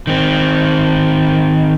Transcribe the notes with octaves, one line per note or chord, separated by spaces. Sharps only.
D#3 C4